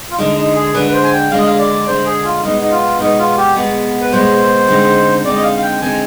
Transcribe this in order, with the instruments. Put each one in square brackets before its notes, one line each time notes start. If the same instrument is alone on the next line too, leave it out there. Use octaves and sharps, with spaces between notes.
[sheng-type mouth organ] F4
[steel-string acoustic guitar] D3 G#3 D4 [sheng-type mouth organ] D#4
[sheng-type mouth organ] D#4
G#4
[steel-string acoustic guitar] D3 G#3 D4 [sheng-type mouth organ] B4
[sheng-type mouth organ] B4
C5
G#5
G5
[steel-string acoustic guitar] D3 G#3 D4 [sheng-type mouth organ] F5
[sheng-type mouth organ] D#5
F5
D5
[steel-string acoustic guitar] D3 G#3 D4 [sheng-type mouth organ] C5
[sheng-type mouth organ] G#4
F4
[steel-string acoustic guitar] B2 G#3 B3 [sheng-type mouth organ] D#4
[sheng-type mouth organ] D#4
F4
[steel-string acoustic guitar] B2 G#3 B3 [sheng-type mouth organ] D#4
[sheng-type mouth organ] F4
G4
[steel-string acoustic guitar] B2 G#3 B3
[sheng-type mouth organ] B4
[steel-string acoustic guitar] B2 G#3 B3 [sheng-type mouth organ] C5
[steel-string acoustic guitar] D3 G#3 C4 D#4
[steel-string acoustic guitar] D3 G#3 C4 D#4 [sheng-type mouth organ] D5
[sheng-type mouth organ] D#5
F5
F5
G5
[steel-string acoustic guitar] D3 G#3 C4 D#4 [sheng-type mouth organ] G#5